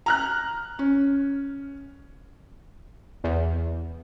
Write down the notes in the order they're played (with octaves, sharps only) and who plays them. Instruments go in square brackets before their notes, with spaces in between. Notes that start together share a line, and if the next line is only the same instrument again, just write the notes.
[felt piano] A#5 F6 F#6
C#4
[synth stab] E2